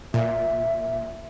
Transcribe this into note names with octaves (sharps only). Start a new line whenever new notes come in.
A#2 E5